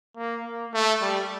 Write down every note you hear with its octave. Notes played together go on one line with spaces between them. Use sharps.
A#3
A#3
A3
G3